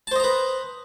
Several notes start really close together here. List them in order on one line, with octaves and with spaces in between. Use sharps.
A5 C5 D#5 A#5 B4